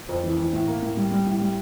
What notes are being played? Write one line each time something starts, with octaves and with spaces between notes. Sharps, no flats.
F2
E3
E3
A2
A#3
A2
G3
G3
A2
G3